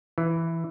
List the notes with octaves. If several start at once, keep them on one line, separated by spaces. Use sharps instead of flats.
E3